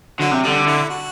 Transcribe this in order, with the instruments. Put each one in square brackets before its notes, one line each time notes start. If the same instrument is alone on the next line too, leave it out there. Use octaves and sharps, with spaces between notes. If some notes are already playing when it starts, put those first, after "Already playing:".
[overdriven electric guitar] D3 [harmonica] F#3
[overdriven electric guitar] C3
[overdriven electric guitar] D3 [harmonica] G3
[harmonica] E4
F#4